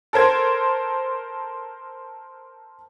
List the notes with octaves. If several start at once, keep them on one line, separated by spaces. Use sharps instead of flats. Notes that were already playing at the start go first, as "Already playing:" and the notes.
A4 A#4 C5 G#6